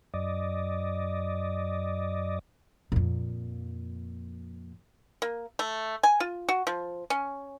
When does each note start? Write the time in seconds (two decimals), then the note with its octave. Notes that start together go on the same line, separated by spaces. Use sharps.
0.14 F#2 D5 D#5
2.92 F2 A#2
5.22 A#3
5.59 A3
6.03 G#5
6.20 F4
6.49 F#4
6.67 F3
7.10 C#4